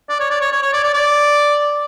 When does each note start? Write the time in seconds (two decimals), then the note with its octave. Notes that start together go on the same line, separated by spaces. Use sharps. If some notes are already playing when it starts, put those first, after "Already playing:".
0.09 D5
0.20 C#5
0.30 D5
0.41 C#5
0.52 C#5
0.62 C#5
0.73 D5
0.84 D5
0.94 D5